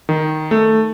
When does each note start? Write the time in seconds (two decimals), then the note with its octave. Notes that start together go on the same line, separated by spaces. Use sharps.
0.09 D#3
0.51 A3